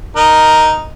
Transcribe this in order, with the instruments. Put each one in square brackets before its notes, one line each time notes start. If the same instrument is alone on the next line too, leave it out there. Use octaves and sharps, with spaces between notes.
[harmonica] D#4 A#4